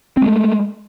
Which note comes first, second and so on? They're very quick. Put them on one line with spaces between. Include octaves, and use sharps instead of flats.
C4 G#3 A3